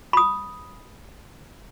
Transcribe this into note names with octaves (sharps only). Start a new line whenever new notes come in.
B5 D#6